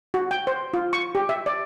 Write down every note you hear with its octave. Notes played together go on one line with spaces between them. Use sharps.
F#4
G5
C5
F4
C#6
G4
E5
D5